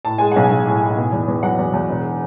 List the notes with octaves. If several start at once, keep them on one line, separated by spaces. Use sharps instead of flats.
A2 A5
G#3 G#5
B1 F#5
G#5
B1
A2
A2
B2
E2
E2
F#3 F#5
E2
E2
E1